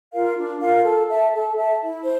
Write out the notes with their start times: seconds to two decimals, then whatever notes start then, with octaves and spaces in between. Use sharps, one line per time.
0.13 F4 A#4 F5
0.38 D4
0.61 F4 A#4 F5
0.85 A4
1.10 E5 A5
1.33 A4
1.57 E5 A5
1.82 E4
2.04 C5